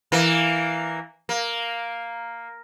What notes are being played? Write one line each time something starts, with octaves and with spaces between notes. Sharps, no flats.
E3 A#3
A#3